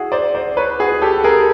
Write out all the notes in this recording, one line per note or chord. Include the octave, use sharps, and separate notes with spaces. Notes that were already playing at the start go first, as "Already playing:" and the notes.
Already playing: E4 F#4 G#4
C5 D5
C5 D5
B4 C#5
F#4 G#4
G4 A4
G#4 A#4